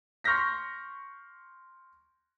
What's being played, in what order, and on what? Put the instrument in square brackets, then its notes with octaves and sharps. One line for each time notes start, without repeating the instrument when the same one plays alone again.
[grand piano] C6 C#6 F6 G6 A#6 B6